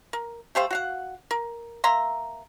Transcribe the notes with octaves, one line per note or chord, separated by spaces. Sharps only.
A#4
A3 G4 C5 F5
F#4 F5 F#5
A#4
A#3 E5 A#5 C6